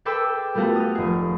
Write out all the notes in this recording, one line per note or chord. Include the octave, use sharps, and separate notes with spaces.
G#4 A4 B4 G5 D6 E6
G3 A3 B3 F4 F#4 A4
D#6 F6
F1 G#4